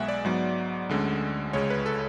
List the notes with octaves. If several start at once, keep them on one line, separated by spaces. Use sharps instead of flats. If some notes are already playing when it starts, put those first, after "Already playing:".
Already playing: B1 B2 G#3 B3 E5 F#5 G#5
D5
G#2 F#3 B3
D2 D3 G#3 C#4
C#2 C#3 G#3 C#5
B4
A4